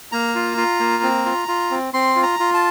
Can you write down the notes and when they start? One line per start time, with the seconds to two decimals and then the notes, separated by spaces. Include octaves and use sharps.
0.12 A#3 A#5
0.35 F4
0.57 F4
0.80 A#3
1.03 C4
1.26 F4
1.48 F4
1.71 C4
1.94 C4 C6
2.16 F4
2.23 A#5
2.39 F4
2.54 A5